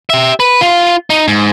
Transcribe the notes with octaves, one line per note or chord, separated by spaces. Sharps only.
G4 E5
B4
F4
D#4
G#2